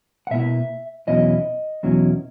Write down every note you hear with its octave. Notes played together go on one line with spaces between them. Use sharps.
F#5
B2 A#3 E4 E5
E2 B2 F#3 C#4 E4 D#5
E2 B2 F#3 C#4 E4